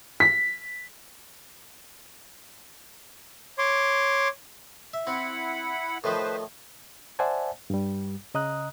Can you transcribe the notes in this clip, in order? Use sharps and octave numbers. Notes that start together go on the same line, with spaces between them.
B6
C#5 C6 D6
E5
C4 E4 F#5 B5
A2 D#3 F3 B4 C5
C5 D5 E5 F#5 G#5 A5
G2 G3
C#3 D#5 A#5 D#6 F#6